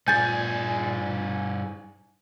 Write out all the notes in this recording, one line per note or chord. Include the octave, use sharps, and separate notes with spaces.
G2 A#2 G#4 G#5 G6 A6